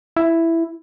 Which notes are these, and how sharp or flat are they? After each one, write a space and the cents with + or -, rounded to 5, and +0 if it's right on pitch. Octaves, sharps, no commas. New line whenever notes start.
E4 +5